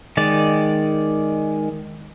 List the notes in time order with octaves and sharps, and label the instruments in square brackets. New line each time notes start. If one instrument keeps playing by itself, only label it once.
[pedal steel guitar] D#3 G#3 D5